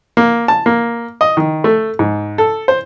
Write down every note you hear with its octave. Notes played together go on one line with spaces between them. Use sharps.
A#3
A5
A#3
D#5
D#3
A3
G#2
A4
C5